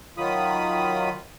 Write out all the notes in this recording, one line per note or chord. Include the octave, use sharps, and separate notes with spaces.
D#3 F#3 F4 B5 D#6